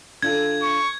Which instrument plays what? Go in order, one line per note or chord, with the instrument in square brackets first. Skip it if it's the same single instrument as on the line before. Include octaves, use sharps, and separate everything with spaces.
[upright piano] D3 F4 A4 [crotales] G#6
[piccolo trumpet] C#6